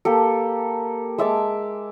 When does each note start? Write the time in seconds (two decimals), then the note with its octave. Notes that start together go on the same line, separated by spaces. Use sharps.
0.05 A#3 G4 A4
1.18 G#3 E5 A5 D6